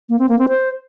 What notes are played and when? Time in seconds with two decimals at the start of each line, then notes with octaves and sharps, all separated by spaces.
0.09 A#3
0.19 C4
0.29 A#3
0.39 C4
0.49 C5